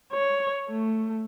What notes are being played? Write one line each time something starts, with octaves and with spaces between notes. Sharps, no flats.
C#5
A3